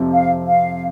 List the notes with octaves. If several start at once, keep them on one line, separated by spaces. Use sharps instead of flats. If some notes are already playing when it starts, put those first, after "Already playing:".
Already playing: F2 C3 F3
F5
F5